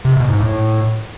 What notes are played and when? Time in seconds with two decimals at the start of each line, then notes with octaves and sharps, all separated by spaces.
0.05 C3
0.17 B2
0.28 G#2
0.40 A2